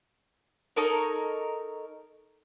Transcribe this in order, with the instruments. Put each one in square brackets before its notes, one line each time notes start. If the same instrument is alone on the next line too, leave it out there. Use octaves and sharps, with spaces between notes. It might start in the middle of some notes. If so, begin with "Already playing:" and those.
[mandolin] D#4 A4 A#4 C#5